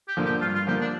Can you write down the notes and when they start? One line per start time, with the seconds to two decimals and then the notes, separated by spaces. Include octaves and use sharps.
0.08 G4
0.17 D3 F3 A#3
0.25 G4
0.41 G2 F4
0.54 F4
0.67 D3 F3 A#3 G4
0.81 D4